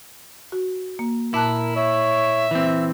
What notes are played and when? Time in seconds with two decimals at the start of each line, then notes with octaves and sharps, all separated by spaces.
0.52 F#4
0.99 A#3
1.34 A#2 E4 A#4 A5 F#6
1.76 C#5 E5
2.51 E3 C4